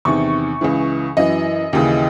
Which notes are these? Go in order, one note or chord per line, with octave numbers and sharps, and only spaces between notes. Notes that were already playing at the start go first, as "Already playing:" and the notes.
E2 C3 D#3 C#6
C#2 C#3 E3
F#2 E3 D#5
D#2 C#3 E3